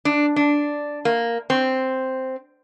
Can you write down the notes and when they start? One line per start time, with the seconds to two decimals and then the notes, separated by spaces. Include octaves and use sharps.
0.05 D4
0.36 D4
1.05 A#3
1.50 C4